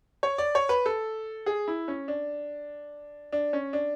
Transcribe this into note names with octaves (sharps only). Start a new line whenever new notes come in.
C#5
D5
C#5
B4
A4
G#4
E4
C#4
D4
D4
C#4
D4